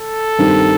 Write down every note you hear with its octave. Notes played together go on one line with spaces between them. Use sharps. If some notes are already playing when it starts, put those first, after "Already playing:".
Already playing: A4
G2 D#3 G3 C4